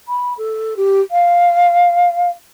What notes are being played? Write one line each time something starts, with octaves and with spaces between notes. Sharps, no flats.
B5
A4
G4
F5